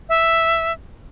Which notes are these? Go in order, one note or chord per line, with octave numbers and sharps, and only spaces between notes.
E5